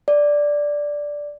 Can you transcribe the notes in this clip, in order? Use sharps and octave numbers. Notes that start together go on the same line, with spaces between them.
D5